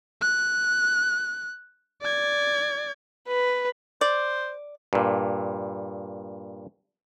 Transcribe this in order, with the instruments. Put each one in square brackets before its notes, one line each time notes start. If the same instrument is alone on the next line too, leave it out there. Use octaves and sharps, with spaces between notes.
[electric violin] F#6
D5 G#6
[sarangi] B4
[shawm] C5 [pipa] D5
[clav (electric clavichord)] G2 A#2